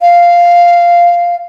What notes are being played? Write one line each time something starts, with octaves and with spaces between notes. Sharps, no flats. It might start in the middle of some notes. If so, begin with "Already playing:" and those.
F5